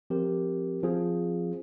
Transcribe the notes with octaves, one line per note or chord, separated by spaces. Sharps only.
F3 C4 G4 A#4
F3 C4 F4 G#4